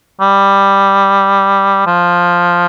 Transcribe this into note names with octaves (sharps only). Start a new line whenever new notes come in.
G3
F3